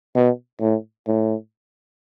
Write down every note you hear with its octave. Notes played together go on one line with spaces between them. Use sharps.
B2
A2
A2